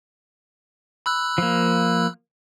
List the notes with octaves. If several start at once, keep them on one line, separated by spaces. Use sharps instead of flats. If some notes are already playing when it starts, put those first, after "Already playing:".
B5 E6 F#6
F3 A#3